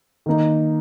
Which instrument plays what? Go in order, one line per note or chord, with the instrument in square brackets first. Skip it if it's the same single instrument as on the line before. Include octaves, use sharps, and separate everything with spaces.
[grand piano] D#3 A#3 D#4